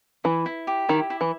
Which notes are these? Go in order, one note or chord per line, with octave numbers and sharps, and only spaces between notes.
E3 E4
E4
G4
D#3 E4
E4
E3